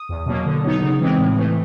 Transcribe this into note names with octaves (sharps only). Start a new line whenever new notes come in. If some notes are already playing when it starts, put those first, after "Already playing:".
Already playing: D#6
E2
B2 F#3 A#3
D3
F#3 B3 D#4
C#3
E3 G#3 C4
A2
E3 A3